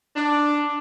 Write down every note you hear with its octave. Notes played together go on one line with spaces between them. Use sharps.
D4